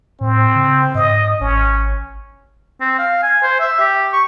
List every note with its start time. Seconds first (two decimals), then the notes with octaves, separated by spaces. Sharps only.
0.21 A2 C4
0.56 C#3
0.95 G#2 D#5
1.41 G#1 C#4
2.81 C4
2.99 F5
3.23 G#5
3.43 C5
3.60 E5
3.80 G4
4.13 C#6